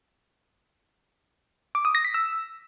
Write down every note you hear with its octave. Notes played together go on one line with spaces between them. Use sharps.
D6
D#6
A#6
B6
E6